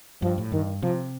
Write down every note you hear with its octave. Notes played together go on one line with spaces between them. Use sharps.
G2 F3
A2
G2 D#3
C3 F3